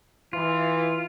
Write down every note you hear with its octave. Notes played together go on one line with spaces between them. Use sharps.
E3 F4